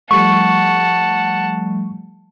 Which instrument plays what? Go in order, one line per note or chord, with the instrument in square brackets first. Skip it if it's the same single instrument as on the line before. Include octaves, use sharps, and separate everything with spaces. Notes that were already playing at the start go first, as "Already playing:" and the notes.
[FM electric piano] F3 G3 A3 [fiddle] F#5 A5 [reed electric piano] C#6